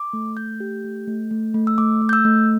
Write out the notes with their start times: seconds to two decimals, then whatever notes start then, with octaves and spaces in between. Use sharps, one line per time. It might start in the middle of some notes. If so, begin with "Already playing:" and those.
Already playing: D6
0.13 A3
0.37 A3 G6
0.60 G4
0.84 A3
1.07 A3
1.31 A3
1.54 A3
1.67 E6
1.78 A3 D6
2.02 A3
2.09 G6
2.13 E6
2.25 A3